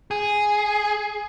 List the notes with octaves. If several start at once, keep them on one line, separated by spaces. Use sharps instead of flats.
G#4